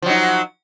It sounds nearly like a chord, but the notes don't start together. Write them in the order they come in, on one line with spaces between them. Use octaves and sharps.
F3 F#3 D#4